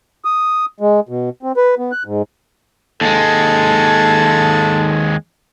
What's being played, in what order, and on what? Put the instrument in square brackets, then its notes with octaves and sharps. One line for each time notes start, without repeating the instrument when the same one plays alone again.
[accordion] D#6
G#3
B2
C4
B4
B3
F#6
G#2
[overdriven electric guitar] D#2 G#3 [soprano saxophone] A4